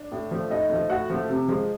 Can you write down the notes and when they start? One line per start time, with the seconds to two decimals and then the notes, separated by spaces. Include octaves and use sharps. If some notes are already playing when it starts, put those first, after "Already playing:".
Already playing: D4
0.12 A2
0.31 F3 A3
0.50 A2 D#4 D#5
0.70 F3 A3
0.89 A2 F#4 F#5
1.10 F3 A3
1.29 C3
1.48 F3 G#3